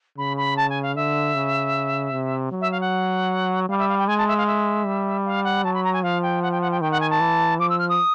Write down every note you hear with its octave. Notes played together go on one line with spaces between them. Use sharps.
C#3 B5
B5
A5
G#5
F5
D3 E5
C#3
C3
F#3
E5
F5
F#5
G3 F5
E5
F5
G5
G#3 G#5
A5
E5
F5
E5
G3
F5
F#5
F#3 A5
B5
A#5
G#5
F3 F5
G5
F#5
G5
F#5
G5
D#3 G5
F#5
G#5
A5
E3
F3 D6
E6
F6
D#6